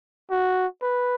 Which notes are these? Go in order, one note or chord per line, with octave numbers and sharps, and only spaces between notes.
F#4
B4